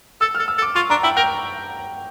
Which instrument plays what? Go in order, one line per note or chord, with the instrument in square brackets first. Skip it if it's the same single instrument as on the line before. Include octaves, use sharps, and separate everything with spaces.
[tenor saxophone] A4 [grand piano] E6
[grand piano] F6
[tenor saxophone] A4
[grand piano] E6
[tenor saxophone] A4
[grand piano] D6
[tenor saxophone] F4 [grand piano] C#6
[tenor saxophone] D4 [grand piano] A#5
[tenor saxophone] E4 [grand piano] G5
[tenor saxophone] A#4 [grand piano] G5